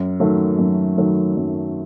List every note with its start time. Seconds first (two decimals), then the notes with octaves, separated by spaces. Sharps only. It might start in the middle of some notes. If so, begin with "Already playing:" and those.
Already playing: F#2
0.20 D#3 F#3 A3
0.59 F#2
0.97 D#3 F#3 A3
1.36 F#2